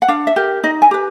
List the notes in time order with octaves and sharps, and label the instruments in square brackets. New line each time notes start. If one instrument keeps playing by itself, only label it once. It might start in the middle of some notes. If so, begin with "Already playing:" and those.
[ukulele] F#5
D4 F5
E5
G4 A#4
D#4 D#5
G#5
G4 B4